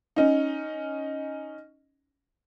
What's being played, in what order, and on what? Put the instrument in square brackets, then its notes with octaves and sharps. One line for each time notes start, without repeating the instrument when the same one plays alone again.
[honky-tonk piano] C#4 D#4